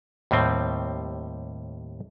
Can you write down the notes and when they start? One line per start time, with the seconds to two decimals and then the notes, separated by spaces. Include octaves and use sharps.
0.31 D#2 A2 G3 C4